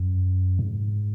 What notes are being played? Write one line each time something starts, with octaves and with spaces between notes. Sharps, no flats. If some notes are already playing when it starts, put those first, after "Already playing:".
Already playing: F#2
G#2